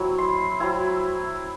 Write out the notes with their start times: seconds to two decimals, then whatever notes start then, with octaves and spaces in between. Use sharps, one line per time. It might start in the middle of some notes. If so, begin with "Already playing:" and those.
Already playing: F#3 C4 E4
0.18 C6
0.60 F#3 C4 E4